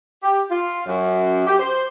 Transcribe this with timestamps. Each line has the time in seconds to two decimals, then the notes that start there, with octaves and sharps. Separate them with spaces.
0.23 G4
0.49 F4
0.86 F#2
1.47 G4
1.59 C5